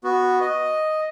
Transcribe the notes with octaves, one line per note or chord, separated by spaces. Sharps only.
B3 F#4
D#5